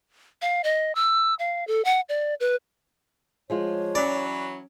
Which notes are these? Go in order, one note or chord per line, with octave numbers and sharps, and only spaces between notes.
F5
D#5
E6
F5
A4
F#5
D5
B4
F3 G#3 F4 C#5
E3 F#3 C#4 D5